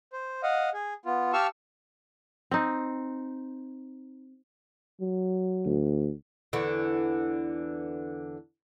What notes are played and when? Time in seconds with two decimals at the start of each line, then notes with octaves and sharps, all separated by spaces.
0.13 C5
0.43 D#5 F5 F#5
0.74 G#4
1.06 B3 F4
1.33 G4 F5 A5 C#6 E6 F6
2.51 C4 D#4
5.01 F#3
5.65 D2
6.53 E2 D3 E3